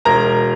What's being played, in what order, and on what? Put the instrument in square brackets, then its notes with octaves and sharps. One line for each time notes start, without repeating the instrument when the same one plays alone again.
[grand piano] E1 A#4 A#5